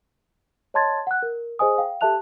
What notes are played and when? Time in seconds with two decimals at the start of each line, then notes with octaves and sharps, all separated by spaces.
0.74 C#5 D#5 A5 C6 G#6 A6
1.07 F#5 F#6
1.22 A#4
1.59 G#4 C5 D#5 G#5 D#6
1.78 F5 G5
2.01 G4 A4 E5 A5 F#6 F7